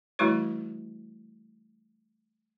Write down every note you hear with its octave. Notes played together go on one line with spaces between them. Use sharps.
E3 G3 A3 E4 F#4 C#5